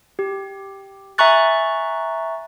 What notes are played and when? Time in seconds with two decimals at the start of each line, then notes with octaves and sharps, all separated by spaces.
0.19 G4
1.18 E5 G#5 A#5 C#6 F#6 A6